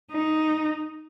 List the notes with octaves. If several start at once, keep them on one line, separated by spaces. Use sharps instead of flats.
D#4